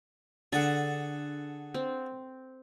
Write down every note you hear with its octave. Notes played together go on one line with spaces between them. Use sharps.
D3 D4 G#4 A4 F#5 A6
C4